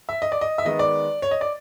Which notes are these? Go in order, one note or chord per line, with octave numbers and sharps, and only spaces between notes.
E5
D#5
D5
D#5
E5
D#3 G#3 B3 D#5
D5
C#5
D#5
D5